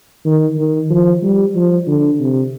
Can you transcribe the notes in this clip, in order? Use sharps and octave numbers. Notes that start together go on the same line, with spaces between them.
D#3
D#3
F3
G3
F3
D3
C3